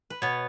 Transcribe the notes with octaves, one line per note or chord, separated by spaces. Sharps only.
B4
B2 B3 C#5